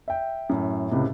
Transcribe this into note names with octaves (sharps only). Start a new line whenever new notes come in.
E5 G5
F#2 A2
C#2 A2 C3